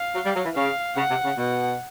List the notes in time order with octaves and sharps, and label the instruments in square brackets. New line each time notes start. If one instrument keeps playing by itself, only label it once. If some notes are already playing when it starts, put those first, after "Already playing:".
Already playing: [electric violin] F5
[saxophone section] F#3
G3
F#3
E3
[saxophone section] C#3 [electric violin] F5
[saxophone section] C#3 [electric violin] F#5
[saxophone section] C3
C#3
[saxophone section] B2 [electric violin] F#5